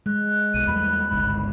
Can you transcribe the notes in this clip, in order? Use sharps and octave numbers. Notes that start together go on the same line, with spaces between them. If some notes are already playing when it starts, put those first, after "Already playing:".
G#3 F#6
B1 D#7
E2 G3 A3 B5
G1 C#2 G#2